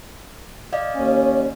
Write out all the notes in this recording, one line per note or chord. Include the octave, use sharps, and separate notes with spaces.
D5 D#5 F5
D#2 C#4